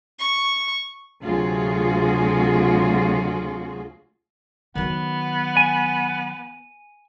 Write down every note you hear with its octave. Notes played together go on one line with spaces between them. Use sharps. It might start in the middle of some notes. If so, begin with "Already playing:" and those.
C#6
D2 C3 F#3 F4 F#4 G#4
D#3 F#3 B3
G#5 D#7